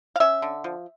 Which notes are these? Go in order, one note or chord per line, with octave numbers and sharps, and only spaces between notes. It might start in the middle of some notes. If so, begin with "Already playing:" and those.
F5
C#4 E5
D3
F3